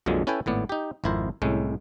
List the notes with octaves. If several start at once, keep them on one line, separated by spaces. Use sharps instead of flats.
A#1 F2 A#2 D3 F#3 G#3
C#4 E4 A4 B4 G5 G#5
G#1 A2 B3 D5
D#4 G4
G#1 F2 E4 A#4 C5
C2 A2 G#3 C#4